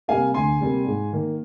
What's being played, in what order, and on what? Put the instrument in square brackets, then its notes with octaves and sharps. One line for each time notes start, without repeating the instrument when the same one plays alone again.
[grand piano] C3 G3 A#3 F5 G#5
D2 G#5 C6
C3 G3 A#3
G#2
D#3 A#3